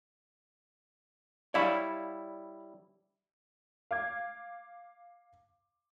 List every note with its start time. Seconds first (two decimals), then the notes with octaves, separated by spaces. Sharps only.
1.54 G3 E4 C#5 D5 F5 B5
3.91 F5 D6 G#6